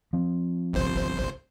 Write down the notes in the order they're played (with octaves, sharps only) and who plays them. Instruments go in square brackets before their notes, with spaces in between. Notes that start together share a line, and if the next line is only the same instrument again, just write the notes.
[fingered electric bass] F3 C4
[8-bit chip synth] G1 C2 C5